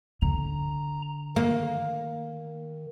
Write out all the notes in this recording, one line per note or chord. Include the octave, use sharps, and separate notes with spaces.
D3 A#5
D#3 A#3